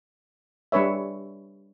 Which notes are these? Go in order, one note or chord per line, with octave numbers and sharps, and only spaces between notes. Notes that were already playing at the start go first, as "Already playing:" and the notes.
G3 D4 B4 C#5 E5